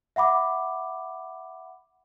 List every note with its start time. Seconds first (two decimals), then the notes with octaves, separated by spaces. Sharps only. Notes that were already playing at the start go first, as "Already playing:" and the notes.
0.16 E5 F#5 B5 D6